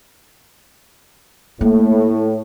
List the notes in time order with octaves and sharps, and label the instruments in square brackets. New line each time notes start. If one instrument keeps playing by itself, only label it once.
[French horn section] A2 [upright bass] A#3